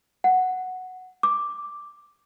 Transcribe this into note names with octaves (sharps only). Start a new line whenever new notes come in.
F#5
D6